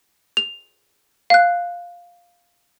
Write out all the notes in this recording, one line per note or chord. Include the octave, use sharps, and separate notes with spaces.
F7
F5 F#6